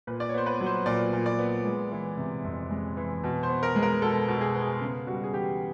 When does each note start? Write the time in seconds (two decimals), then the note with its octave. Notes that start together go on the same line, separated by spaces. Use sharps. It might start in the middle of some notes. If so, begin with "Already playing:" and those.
0.07 A#2 B4
0.20 D5
0.29 C#5
0.34 B3 C5
0.46 B4
0.60 F#3
0.66 C5
0.86 A#2 D5
1.13 A#2
1.26 D5
1.39 B3
1.65 G#3
1.91 E3
2.17 C3
2.44 F2
2.71 G#3
2.97 E3
3.24 B2
3.43 C5
3.49 B3
3.63 A#4
3.76 G#3
3.83 A#4
4.02 B2 A4
4.28 B2
4.41 G#4
4.55 B3
4.62 G#4
4.81 C#3
5.07 G3 F#4
5.24 G#4
5.33 E3 G4